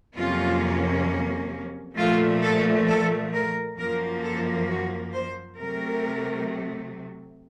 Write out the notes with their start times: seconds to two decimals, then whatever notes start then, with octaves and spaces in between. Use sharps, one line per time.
0.16 F2 C3 F#3 A#3 C#4 F4
1.97 A#2 F3 A3 F4
2.43 A4
2.87 A4
3.33 A#4
3.78 F#2 F3 A#3 A#4
4.23 A4
4.69 F#4
5.13 C5
5.58 C3 F#3 A3 A#4